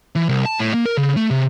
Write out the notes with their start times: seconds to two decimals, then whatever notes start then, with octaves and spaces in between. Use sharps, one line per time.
0.15 E3
0.29 C2
0.45 A5
0.59 A2
0.74 A#3
0.85 A#4
0.97 C#3
1.16 A3
1.31 C3